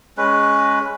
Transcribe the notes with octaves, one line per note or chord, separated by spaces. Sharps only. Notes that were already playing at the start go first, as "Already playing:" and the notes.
G#3 C#4 B4